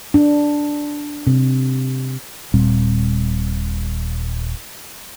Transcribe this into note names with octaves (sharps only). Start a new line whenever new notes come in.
D4
C3
D#1 A#2 G3 C4